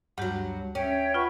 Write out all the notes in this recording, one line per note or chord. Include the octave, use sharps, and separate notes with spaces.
D2 G2 F#3 G4
C#4 C#5 E5 G5
F4 B4 E5 F#5 C#6